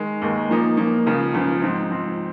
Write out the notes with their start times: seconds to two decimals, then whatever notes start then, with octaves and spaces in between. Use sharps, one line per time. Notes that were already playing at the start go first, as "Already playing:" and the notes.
Already playing: D#3 G#3
0.22 D#2 D#3 G#3
0.49 A#2 F3 A#3 D#4
0.77 A#2 F3 A#3 D#4
1.07 C#2 C#3 F3
1.34 C#2 C#3 F3
1.62 G#2 F3 C4
1.91 G#2 F3 C4